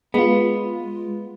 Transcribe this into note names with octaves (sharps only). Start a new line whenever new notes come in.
G#3 B3 F4